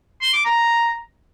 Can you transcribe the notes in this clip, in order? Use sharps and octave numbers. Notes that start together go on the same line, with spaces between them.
C6
D6
A#5